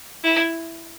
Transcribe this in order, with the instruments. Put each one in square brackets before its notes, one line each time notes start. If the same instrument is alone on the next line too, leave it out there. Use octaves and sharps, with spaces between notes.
[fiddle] E4